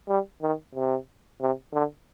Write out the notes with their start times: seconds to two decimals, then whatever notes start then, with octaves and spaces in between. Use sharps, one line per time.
0.09 G3
0.42 D#3
0.75 C3
1.41 C3
1.74 D3